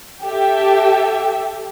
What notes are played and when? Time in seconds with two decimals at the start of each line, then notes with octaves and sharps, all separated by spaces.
0.23 G4 A4 E5